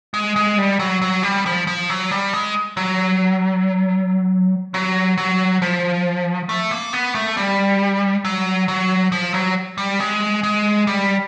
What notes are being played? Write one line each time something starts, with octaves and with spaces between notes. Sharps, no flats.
G#3
G#3
G3
F#3
F#3
G3
F3
F3
F#3
G3
G#3
F#3
F#3
F#3
F3
A3
A#3
B3
A3
G3
F#3
F#3
F3
F#3
G3
G#3
G#3
G3